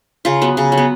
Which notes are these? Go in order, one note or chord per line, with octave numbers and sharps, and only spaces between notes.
C#3 F4
F#3 B3
C#3
F#3
B3